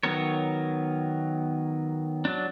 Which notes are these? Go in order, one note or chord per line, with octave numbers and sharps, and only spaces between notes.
D#3 F#3 B3 A#4 C#5
F#3 D4